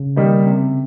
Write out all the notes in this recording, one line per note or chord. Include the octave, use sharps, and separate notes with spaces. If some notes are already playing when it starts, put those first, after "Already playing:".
Already playing: C#3
D#3 G3 A#3 D#4
C3